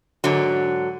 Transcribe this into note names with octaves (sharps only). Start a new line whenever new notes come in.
G#2 D3 F#3